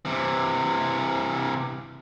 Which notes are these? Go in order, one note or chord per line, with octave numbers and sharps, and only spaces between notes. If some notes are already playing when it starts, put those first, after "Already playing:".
C3 E3